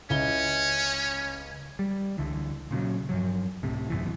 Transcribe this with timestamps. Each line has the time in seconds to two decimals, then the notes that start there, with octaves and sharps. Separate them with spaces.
0.10 C#2 C#4 E4 G7
1.79 G3
2.18 C#2 D3 E3
2.71 A#2 C#3 E3 F#3
3.09 G2 F3 F#3
3.63 C#2 A2 C3
3.90 G#1 F#2 B2 E3